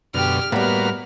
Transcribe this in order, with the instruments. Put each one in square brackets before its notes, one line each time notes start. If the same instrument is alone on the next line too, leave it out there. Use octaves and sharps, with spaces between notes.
[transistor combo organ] F#2 B2 D3 [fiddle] G4 F6
[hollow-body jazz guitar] A2 G3 [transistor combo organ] A#3 F#4 B4 [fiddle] B3 F6